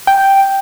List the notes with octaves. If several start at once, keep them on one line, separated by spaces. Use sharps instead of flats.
G5